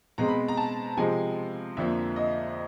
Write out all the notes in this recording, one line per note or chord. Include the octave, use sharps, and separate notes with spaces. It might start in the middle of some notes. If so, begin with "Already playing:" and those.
B2 G#3 C4 A#5
B5
A#5
A5
C3 F3 G#3 G#5
F2 D3 F3 A#3 E5
D#5